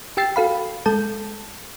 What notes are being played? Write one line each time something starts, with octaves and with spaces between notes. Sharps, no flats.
G4 G5 E6 A6 C7
F#4 A4 F5 B5
G#3 A4 A5 G6